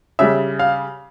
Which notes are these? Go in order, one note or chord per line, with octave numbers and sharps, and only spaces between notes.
C#3 G3 E5
F5